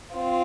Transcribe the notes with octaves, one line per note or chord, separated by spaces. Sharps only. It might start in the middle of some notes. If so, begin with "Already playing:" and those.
C4 F4